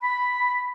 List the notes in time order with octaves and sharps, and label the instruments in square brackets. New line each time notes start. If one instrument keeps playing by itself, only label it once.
[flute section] B5